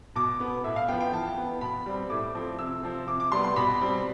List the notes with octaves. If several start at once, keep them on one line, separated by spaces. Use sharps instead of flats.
B2 D6
B3
A2 E5
F5
F3 B3 G5
G5
E3 A5
B3
B2 B5
G3 C4
A2 D6
F3 A3 C4
C3 E6
F3 C4
C3 D6
D6
G3 B3 C6
C6
B2 B5
G3 C4